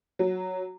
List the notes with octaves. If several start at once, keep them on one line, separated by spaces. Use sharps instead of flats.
F#3